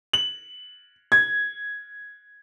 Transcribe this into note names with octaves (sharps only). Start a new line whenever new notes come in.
F#7
G#6